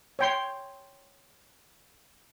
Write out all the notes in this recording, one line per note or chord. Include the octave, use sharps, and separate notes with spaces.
C#5 G5 C6